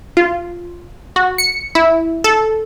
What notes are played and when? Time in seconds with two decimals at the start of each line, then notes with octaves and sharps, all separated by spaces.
0.17 F4
1.16 F#4
1.38 C#7
1.75 E4
2.24 A4